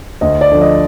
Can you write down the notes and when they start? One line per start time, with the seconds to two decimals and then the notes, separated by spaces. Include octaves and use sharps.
0.21 D2 D#5
0.41 D5
0.52 D3 F3
0.62 D#5